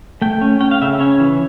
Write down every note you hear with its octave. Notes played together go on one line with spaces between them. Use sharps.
A3 G5
C#4
C#4 G5
F5
C#3 E5
C#4 C#5
E3